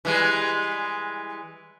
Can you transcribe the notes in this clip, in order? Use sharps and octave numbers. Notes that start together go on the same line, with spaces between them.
E3 G3 G#3